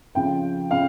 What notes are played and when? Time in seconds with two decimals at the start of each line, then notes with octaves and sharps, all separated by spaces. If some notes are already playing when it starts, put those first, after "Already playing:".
0.15 F2 C#3 F3 G5
0.71 C#3 F3 F5